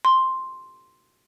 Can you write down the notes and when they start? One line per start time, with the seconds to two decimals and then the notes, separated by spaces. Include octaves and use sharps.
0.05 C6